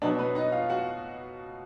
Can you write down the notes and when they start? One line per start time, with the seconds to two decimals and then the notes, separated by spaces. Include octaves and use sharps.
0.02 B2 F#3 B3 D4 D5
0.19 B3 B4
0.35 D#4 D#5
0.52 F4 F5
0.69 F#4 F#5